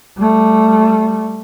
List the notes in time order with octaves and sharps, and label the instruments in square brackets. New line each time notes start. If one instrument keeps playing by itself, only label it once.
[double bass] G3 A3